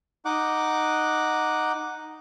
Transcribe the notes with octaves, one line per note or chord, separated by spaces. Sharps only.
D#4 F#5 D6